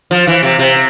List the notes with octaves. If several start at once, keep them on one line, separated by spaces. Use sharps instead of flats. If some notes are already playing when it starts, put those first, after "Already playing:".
F3
E3
C3
C3